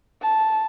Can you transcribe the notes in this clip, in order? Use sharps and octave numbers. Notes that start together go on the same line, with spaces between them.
A5